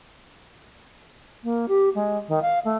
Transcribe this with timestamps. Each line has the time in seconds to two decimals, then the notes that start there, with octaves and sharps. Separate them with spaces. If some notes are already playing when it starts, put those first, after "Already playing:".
1.43 A#3
1.68 G4
1.95 G#3
2.28 D#3
2.42 F5
2.65 A3